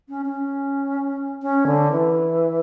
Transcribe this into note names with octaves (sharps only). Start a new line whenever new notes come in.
C#4
C#4
C#4
D3
E3